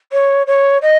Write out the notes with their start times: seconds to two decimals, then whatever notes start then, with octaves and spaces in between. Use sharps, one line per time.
0.12 C#5
0.46 C#5
0.81 D#5